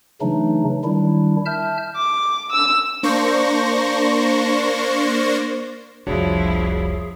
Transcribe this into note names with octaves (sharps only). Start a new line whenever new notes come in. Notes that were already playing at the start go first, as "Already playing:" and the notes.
C#3 E3 F#3 A3 D4 D#4
D#3 G3 D4 E4
E5 A5 F6 G6
D6
E6
A#3 D4 C5 C#6 A#6
F1 C2 F3 D4 E4 F#4 G#4 C#5